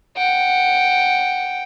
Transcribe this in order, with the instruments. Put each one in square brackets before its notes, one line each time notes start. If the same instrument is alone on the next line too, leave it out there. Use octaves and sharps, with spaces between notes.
[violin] F#5 G5